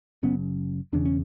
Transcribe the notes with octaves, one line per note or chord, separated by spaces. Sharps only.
F#1 F#2 C#3 B3 C#4
E1 E2 C#3 D4
C#4